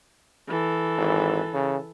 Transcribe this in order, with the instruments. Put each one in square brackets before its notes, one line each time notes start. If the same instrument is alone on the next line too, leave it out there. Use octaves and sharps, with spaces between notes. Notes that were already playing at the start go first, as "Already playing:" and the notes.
[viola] E3 A4
[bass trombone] G#1
C#3